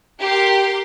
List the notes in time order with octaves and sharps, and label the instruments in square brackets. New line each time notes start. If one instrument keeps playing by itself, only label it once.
[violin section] G4 A#4 C6